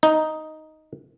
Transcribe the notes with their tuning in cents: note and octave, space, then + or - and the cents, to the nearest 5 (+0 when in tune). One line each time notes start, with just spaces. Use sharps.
D#4 +5